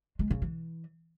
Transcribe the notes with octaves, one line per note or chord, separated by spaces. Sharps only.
G#3
C#3
E3